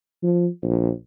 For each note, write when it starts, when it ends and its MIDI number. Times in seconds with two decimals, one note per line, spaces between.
0.23 0.47 53
0.63 0.90 34